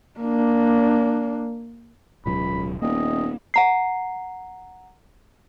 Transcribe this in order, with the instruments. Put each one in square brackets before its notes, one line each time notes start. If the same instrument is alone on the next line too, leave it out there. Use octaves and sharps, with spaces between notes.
[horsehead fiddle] A#3 D4
[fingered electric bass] D1 B2 F#3 [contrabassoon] C#2 [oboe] B5
[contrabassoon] D#1 [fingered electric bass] A#3 B3 [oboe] D#5
[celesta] F#5 A#5 C7